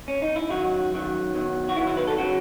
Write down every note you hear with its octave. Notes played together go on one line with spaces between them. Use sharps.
C#4
D#4
E4
F#2 D#3 F#3 F#4
F#2 D#3 F#3
E2 D#3 F#3
F#4
E2 D#3 F#3 E4
E4
B4
A4
C#3 F#3 F#4